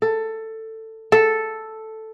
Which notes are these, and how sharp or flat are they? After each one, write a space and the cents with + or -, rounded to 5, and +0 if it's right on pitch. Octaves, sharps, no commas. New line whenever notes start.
A4 +15
A4 +0